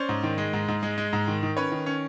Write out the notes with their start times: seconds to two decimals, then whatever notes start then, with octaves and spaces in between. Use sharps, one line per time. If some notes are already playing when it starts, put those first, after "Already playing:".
Already playing: C#4 C5 D5
0.09 G#2
0.23 D#3
0.38 G#3
0.53 G#2
0.68 G#2
0.83 G#3
0.98 G#3
1.13 G#2
1.28 D#3
1.43 D#3
1.57 C#4 B4 C#5
1.72 D#3
1.86 C#4